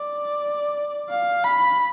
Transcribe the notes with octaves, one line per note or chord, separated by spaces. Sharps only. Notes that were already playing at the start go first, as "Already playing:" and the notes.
Already playing: D5
F5
B5